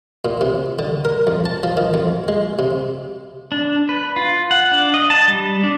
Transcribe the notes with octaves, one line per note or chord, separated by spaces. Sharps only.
A#2
C3
D3
A#4
F2
A5
F3
D#3
F2
G#3
C3
D4
B4
F4
F#5
D4
D#5
A5
G3
D4